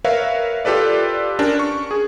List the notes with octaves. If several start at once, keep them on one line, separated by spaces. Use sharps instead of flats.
A#4 B4 C#5 E5 F5
F4 G4 A4 B4 D5
C#4 D4 G4 A#4
C#6
G#4